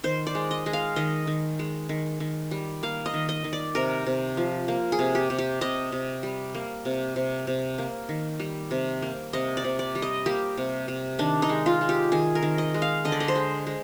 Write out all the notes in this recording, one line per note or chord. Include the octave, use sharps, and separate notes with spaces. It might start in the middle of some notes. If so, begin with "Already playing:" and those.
D#3 C5
D5
G#3
D#5
G#3
F5
D#3 D#5
D#3
G#3
D#3
D#3
G3
A#3 F5
D#5
D#3
D#5
D#3
D5
C3 A#4
C3
F3
A#3
G#4
C3
G4
C3
G4
C3 D#5
C3
G3
A#3
C3
C3
C3
A#3
D#3
G3
C3
A#3
C3 D#5
D5
C3
D5
G3
D#5
A#3 G4
C3
C3
D#3 D4
D#4
G#3
F4
G#3
G4
D#3 G#4
A#4
D#3
D#5
G#3
F5
D3 D#5
D5
D#5
C5
G#3
G#3